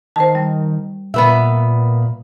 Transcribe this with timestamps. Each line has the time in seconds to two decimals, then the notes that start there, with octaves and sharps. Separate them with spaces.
0.16 D#3 C5 A5
0.35 G3
1.14 A#2 B3 B4 E5